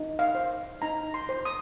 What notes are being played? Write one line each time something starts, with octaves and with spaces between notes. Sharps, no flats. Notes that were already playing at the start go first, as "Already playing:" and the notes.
Already playing: D#4
F5
C5
D#4 A#5
C6
C5
D#6